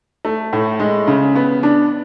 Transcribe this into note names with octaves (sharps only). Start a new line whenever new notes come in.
A3
A2
G#3
C#3
B3
D4